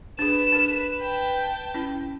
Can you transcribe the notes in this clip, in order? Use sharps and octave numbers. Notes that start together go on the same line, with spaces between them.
D4 G#4 B4 E7
D4 A#4
G5 A5
C#4 E4 B5